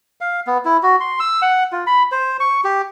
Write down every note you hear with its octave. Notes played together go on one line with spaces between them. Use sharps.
F5
B3
E4
F#4
C6
E6
F#5
F4
B5
C5
C#6
G4